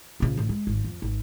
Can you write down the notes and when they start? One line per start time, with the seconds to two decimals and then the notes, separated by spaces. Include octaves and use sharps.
0.20 A#1 C#3
0.37 A1 D3
0.49 G#3
0.67 G#1
0.84 F2
1.02 G#1